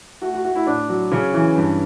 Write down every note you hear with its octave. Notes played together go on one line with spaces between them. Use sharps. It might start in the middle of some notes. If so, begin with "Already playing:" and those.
A3 F#4
F#4
A3 F#4
E4
A2 D4
F#3
C#3 C#4
E3
G2